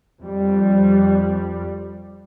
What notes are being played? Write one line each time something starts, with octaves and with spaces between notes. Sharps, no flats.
F2 G3